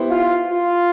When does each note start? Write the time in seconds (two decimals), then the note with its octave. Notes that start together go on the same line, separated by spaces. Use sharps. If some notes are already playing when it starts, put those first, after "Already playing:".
Already playing: B3 E4 G4 C5
0.11 F4
0.48 F4